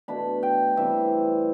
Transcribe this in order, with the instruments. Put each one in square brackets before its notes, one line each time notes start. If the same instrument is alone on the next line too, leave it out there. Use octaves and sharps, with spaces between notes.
[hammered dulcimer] B2 A3 D4 B5
G5
E3 G3 C4 E5